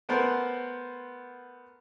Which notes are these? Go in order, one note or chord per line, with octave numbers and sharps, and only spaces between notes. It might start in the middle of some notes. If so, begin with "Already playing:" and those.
A3 B3 A#4 C5 F#5